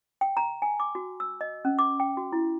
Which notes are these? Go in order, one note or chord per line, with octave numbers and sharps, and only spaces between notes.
G5
A#5
G#5
D6
F#4
E6
D#5
C#4
D6
G5
F#4
E4